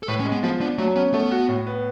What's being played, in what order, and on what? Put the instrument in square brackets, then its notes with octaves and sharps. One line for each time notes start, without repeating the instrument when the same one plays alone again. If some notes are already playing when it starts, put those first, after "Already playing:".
[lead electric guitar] A4
[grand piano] A2 [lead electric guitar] B4
[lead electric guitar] C#4
[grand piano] G#3
[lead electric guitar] B3
[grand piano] F3 [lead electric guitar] B3
[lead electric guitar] B3 [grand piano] D4
[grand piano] F#3 [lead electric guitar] A3
[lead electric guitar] B3 [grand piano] C#4
[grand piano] A3 [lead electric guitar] B3
[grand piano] F#4
A2
B3